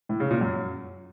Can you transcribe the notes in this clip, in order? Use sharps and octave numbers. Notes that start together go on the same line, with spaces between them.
A2
C#3
A#2
F#2